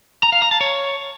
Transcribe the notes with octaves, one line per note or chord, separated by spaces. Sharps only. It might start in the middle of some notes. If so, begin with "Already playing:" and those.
A#5
F5
A#5
A5
C#5